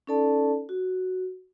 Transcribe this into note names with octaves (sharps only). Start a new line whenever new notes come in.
C#4 D#4 A4 D5 A5
F#4